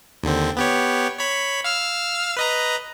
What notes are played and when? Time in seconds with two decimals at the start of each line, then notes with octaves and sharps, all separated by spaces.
0.23 D#2 D3 C4
0.57 B3 G4 C#5
1.19 C#5 B5 B6
1.64 F5 E6 F6
2.37 B4 D#5 A#5